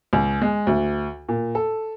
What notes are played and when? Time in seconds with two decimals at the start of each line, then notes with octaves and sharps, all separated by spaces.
0.13 C#2
0.42 G#3
0.67 D2
1.29 A#2
1.55 A4